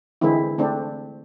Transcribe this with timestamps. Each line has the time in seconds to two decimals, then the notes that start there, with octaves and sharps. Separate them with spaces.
0.21 D3 E3 G#3 C4 E4
0.58 A3 C4 D4